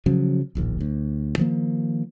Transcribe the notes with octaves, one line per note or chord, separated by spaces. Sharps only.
C#3 F3 F#3 C#4
D1 A#1 D#2
D2
D#3 F3 A#3